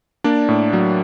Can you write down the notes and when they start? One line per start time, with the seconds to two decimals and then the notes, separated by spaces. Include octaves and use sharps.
0.24 A#3 D4 D5
0.49 A2
0.73 F#3